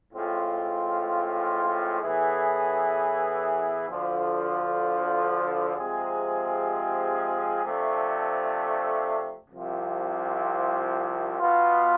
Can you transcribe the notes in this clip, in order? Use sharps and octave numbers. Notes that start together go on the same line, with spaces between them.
A2 G#3 C4 F4
A2 E3 B3 E4 G#4
D2 D3 F3
C3 F3 G#3 C4 G#4
C3 F3 A3 D4
C2 C3 F3
B2 B3 F4